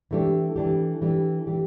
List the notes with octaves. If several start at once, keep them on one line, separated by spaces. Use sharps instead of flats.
E3 A3 D4 G4
E3 A3 D4 G4
E3 A3 D4 G4
E3 A3 D4 G4